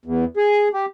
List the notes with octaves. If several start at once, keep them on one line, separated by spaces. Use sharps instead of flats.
E2
G#4
G4